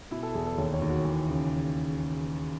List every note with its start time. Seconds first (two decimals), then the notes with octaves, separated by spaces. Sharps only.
0.11 B2 E4
0.23 A4
0.35 E2 G#4
0.47 A4
0.58 D#2 C#5
0.74 C#5
0.82 D#2
0.89 F#4
1.05 E3
1.28 C#3